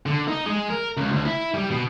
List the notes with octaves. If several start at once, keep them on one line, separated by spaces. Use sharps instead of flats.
D3
D#4
G#3
A#4
C#2
D2
E4
G3
B2